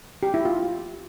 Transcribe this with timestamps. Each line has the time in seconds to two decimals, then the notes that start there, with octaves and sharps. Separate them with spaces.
0.23 G4
0.34 E4
0.45 F4